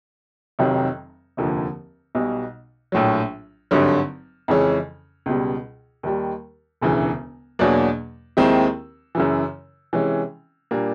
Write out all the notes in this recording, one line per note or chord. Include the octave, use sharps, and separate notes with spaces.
F1 F2 C3 D#3 F#3
F1 D#2 D3 F3
B1 B2 G3
A#1 A2 F#3
G#1 G2 D3 F#3
F2 C#3 E3 G#3 C#4
C#2 B2 G3
D#2 D#3 G3
E1 D2 C#3 E3
E2 B2 F#3 A#3 D4
D#2 D#3 G#3 C4 E4
F#2 C#3 E3
C3 E3 G#3 C#4
A#2 G3 A#3 D4